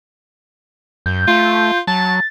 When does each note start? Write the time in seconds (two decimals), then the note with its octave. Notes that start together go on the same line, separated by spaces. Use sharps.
1.06 F#2 G6
1.28 A3 F4
1.87 F#3 A5 A6